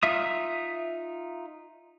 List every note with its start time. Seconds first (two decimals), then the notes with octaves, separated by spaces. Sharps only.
0.03 D#4 F4 E5 D#6